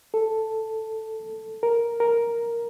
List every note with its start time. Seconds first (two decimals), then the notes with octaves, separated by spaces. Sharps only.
0.14 A4
1.63 A#4
2.00 A#4